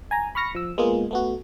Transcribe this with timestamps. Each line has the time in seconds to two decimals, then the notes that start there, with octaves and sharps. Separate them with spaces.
0.11 G#5 A#5
0.35 B5 C#6 F6 A#6 C#7
0.55 F3 E6
0.78 G#3 A#3 B3 F4 G#4
1.11 A3 B3 F#4